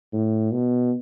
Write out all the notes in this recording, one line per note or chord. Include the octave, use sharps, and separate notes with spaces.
A2
B2